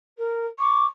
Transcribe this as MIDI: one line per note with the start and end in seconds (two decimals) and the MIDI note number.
0.18 0.46 70
0.59 0.86 85
0.59 0.85 86